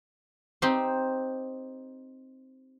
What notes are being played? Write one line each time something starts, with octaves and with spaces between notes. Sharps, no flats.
C4 D#4 G4 C5